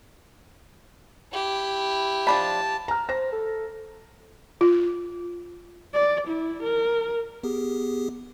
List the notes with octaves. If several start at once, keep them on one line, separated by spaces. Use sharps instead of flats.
E4 G4
F3 D4 A5 B5
A#5 F6
C5 A#6
A4
F4
D5
E4
A#4
B3 G4 G#4